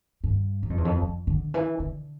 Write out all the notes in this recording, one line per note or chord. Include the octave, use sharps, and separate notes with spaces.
G2
G2
F2
E2
F2
F2
D3
E3
D3